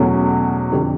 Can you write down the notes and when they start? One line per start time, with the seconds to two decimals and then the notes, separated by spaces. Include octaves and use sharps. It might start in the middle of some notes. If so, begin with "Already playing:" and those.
Already playing: E2 B2 F#3 A3 C#4
0.72 F2 D3 G3